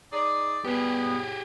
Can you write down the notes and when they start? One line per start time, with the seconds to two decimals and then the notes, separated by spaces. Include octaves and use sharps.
0.12 D#4 G#4 D5
0.65 G3 B3 G4 G#4